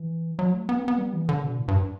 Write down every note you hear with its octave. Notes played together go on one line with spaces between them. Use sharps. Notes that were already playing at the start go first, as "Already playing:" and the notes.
Already playing: E3
F#3
A3
B3
C4
B3
G3
E3
D3
B2
A2
G2